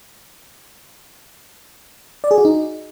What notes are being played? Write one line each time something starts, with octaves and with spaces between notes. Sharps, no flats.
D5
G#4
F#4
D#4